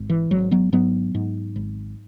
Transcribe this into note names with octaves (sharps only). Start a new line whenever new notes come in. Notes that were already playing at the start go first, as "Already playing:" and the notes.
Already playing: G#1
E3
G#1 F#3
F#3 B3
G#2 F#3 B3
G#2
G#1